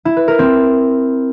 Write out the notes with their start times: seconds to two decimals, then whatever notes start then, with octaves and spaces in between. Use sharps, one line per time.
0.05 E4
0.17 B4
0.28 A#4
0.39 C4